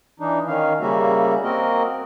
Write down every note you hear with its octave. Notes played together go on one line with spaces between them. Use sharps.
E3 D4 D#4
D#3 C#4 F5
C#3 G3 A#3 C#4 F#4 E5
A#3 C4 F#4 A#4 D#5